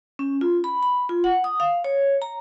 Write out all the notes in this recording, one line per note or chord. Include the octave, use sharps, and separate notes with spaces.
C#4
F4
B5
B5
F4
F#5
D#6
F5
C#5
A#5